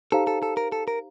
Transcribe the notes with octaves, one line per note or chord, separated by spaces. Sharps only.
D#4 G4 A4 C5 F5 A#5
A4
A4
A#4
A4
A#4